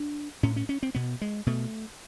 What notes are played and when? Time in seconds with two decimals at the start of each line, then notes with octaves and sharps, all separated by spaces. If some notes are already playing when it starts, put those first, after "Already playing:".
Already playing: D4
0.43 A2 C#4
0.56 C#4
0.69 C#4
0.83 C4
0.95 B2 B3
1.21 G#3
1.46 B2 A3